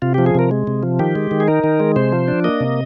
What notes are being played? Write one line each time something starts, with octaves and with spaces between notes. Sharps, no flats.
C3 F4
F3 G4
G#4
C3 A#4
G#3
C3
F3
D#3 G4
G#3
D#3
G#4
D#4 A#4
D#3
G#3
C3 C5
F3
D4
A#3 D#5
C3